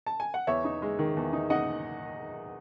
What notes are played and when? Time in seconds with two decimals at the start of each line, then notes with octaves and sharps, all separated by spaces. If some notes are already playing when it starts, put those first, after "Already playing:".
0.06 A5
0.20 G#5
0.34 F#5
0.47 E2 C#5 E5
0.64 D#4
0.82 G#3
0.99 D#3
1.17 E2
1.33 D#4
1.50 D#4 D#5 F#5